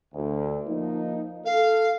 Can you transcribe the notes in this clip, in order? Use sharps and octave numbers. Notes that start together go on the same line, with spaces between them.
D2
F3 A#3 D#4
A4 F5